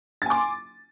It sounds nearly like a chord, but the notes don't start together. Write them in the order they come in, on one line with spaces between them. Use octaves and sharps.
A6 G#5 D6 C6